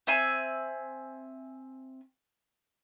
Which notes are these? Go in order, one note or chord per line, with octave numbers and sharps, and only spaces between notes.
C4 E5 G#5 E6